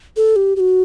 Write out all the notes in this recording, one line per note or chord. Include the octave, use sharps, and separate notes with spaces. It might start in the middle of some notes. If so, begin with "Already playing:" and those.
A4
G4
G4
F#4